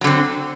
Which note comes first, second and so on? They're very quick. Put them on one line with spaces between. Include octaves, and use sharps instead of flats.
F#3 D3 C4